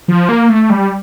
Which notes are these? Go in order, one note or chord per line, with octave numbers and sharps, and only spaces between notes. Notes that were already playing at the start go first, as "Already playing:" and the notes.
F3
A#3
A3
G3